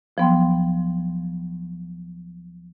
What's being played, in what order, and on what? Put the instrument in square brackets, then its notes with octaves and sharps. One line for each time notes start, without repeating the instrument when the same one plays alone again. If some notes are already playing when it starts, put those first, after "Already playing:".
[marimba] D2 F3 F#3 B3 G5 C6